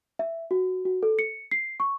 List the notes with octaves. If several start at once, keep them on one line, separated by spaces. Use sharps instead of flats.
E5
F#4
F#4
A4
C#7
C7
C#6